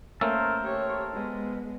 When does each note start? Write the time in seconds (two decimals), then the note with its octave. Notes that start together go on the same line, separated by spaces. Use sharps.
0.21 A3 A#3 C#4 A4 A#4 C5
0.64 G4 C#5
1.14 G#3 B3